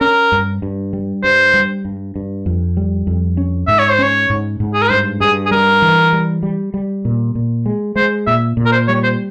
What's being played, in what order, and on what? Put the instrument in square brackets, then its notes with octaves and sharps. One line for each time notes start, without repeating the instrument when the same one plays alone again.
[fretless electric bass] C#4 [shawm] A#4
[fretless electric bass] G2
G2
G3
[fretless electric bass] G2 [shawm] C5
[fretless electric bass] G3
G2
G2
F2
G3
F2
C#4
[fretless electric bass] G#2 [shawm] E5
[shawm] C#5
C5
[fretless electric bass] C#4 [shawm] C#5
[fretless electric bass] G#2
G#2
[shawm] G#4
A#4
[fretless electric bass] G2 [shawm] C5
[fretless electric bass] G2 [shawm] G#4
[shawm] G#4
[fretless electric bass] G3 [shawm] A#4
[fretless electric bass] E3
G3
G3
G3
A#2
A#2
G#3
[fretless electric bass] G#3 [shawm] C5
[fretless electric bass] A#2 [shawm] E5
[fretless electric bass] A#2
[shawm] A#4
C5
[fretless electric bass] G3 [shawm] C#5
[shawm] C5